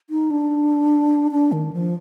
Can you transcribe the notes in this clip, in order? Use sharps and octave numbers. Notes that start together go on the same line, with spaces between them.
D#4
D4
D4
D#3
F3